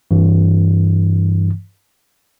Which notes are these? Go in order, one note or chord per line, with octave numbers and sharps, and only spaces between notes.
G2 E3